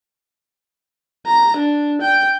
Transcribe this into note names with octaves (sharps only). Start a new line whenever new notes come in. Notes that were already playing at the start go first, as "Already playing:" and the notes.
A#5
D4
G5